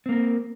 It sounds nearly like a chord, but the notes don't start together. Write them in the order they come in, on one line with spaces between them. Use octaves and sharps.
C4 A#3 A#4